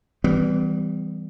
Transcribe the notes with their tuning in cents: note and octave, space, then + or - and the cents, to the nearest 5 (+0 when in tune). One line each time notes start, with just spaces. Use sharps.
E3 -5 G3 +0 B3 +45